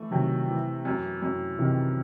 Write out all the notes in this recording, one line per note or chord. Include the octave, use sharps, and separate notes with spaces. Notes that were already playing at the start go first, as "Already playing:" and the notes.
Already playing: E3 A3
C3 D#3 F#3
E3
F#2
F#2
C3 D#3 E3